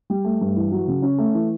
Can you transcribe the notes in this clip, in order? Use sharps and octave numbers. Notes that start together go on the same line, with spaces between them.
G3
A3
G2
E3
F#3
C#3
C#4
A3
E3